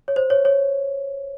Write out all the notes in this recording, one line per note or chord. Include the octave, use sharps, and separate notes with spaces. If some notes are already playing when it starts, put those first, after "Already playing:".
C#5
C5
C#5
C#5